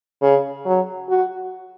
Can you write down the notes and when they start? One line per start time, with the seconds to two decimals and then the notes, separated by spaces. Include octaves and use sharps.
0.22 C#3
0.66 F#3
1.09 F#4